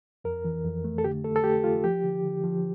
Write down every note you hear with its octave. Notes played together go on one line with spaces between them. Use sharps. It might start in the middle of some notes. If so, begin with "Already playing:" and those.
F2 A#4
E3
F2
A3
A4
D3 G4
A3 A4
A4
A3 G4
A3 F4
F3 G4
D3
D3
F3